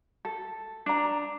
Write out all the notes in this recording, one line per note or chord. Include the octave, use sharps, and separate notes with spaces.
A4
D4 A#5